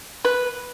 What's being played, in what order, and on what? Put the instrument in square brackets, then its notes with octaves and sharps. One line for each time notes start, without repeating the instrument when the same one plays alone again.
[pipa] B4